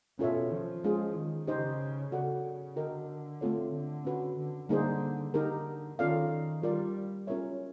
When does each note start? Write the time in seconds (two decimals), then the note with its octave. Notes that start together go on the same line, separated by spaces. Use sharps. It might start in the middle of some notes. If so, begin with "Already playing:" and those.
0.19 B2 C#4 F4 A4 C#5 E5
0.52 F3
0.84 G#3 C#4 F4 G#4
1.15 D#3
1.47 C#3 D#4 G4 C5 D#5
2.12 C#3 F#4 A4 D5 F#5
2.76 D3 F#4 A#4 D#5 G5
3.41 A3 C4 F4 A4 C#5
3.74 D3
4.05 C#4 F#4 B4
4.38 D3
4.69 D3 G3 A#3 D#4 G#4 C5
5.34 D3 D#4 G4 A#4
5.99 D#3 C#4 F4 A4 D5 F5
6.63 G3 F4 A#4 D5
7.27 C#4 F4 A#4 C#5 E5